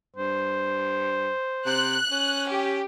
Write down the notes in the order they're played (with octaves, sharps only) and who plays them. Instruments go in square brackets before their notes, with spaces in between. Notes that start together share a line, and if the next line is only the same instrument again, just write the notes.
[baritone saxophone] G2 [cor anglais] C5
[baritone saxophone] C3 [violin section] F#6
[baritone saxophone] C#4
[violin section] G4